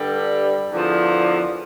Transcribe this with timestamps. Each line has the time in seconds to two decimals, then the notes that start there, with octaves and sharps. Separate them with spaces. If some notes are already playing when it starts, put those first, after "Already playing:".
Already playing: G2 D3 G3
0.71 E2 D3 F3